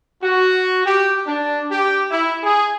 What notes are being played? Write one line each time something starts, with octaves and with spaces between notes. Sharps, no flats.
F#4
G4
D4
G4
E4
G#4